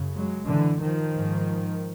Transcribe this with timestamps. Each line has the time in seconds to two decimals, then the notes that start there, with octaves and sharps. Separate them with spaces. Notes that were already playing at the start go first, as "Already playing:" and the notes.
Already playing: F#2 C#3
0.14 F#3 G#3
0.47 D3 E3
0.81 D#3 F3
1.14 G#2